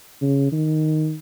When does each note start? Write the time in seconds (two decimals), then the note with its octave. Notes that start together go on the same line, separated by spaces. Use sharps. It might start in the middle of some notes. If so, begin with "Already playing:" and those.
0.21 C#3
0.52 D#3